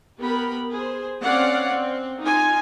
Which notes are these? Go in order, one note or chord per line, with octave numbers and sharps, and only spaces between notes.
B3 G4 A#4 B5
G#4 C5
C4 C#4 D5 F5 F#5
C4
D#4 F4 G#5